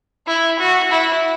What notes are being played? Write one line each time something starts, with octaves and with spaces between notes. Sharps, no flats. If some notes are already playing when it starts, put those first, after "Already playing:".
E4
F#4
E4